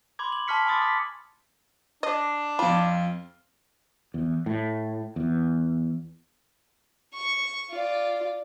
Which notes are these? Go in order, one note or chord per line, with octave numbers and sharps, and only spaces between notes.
B5 C6 D6 G#6
F#7
A5 C6 C#6 F6 B6 C#7
G#5 B5 C6 D6 D#6 A6
D#6 F6 B6
D4 D#5
F2 F4 B5
E2
A2
E2
C#6
F4 D5